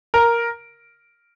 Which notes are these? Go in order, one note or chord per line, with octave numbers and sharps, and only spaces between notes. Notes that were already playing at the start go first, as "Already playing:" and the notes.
A#4